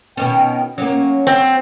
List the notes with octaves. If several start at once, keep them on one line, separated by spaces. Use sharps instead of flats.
B2 D#3 C#4 G5
F#3 A#3 C#4
C4